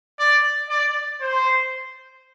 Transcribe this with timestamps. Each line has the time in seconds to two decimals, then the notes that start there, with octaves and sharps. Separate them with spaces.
0.20 D5
0.70 D5
1.21 C5